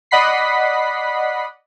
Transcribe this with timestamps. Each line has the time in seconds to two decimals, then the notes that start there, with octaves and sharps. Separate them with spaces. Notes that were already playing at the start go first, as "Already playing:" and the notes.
0.11 D5 D#5 F#5 B5 B6 C7